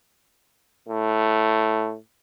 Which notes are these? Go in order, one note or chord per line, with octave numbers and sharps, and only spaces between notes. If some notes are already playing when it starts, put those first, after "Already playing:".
A2